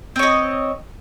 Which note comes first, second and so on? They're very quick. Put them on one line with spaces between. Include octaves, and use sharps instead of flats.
C4 C#5 D#5